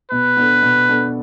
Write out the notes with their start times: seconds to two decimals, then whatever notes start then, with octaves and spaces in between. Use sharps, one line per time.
0.11 B2 B4
0.37 B3 D4 A4
0.63 B2
0.89 B3 D4 A4